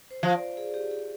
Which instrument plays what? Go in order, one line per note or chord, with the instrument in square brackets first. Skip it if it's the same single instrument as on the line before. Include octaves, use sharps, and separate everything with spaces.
[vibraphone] C5
[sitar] F3
[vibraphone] D5
G#4
G4
G#4